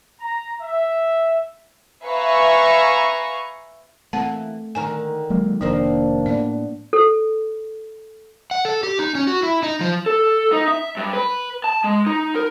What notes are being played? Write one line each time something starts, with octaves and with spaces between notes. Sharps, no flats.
A#5
E5
B4 E5 F5 G#5 A#5 C#6
E3 A3 A#3 C4 F#5 A5
D3 D#3 A#4 G#5
F#3 G#3 A#3
F1 D#3 F3 A#3 C4 D4 A#4 C5
A2 B3 D5
A4
F#5
A4
G4
D#4
C#4
F#4
E4
D#4
F3
A4
D#4
E5
G2
B4
A5
G#3
D#4
A#4